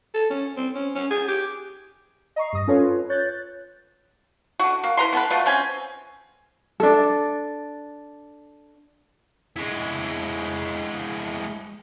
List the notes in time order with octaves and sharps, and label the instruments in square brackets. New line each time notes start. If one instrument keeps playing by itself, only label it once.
[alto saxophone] A4
C#4
C4
C#4
C#4
G#4
G4
[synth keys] D#5 A#5 C#6 C7
G2 D#6 A#6
C#4 F4 A4 B4 C#5
C#5 F#6 G6 A6
[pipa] D3 F#4
A#3
E4 B4 A#5 C6
B3 A4 B4
B2 A3 B3 F4
C4 C#4 G#5
[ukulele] D4 A4
[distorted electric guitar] G#3 E4